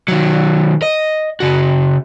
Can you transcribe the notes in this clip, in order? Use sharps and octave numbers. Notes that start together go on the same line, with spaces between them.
D#3 F#3
D#5
C#3 F#4